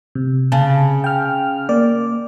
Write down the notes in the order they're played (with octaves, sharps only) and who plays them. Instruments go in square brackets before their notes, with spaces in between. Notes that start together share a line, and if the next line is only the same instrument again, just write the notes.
[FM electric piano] C3
[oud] C#3 [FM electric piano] A5
[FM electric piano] G5 F6
A#3 D5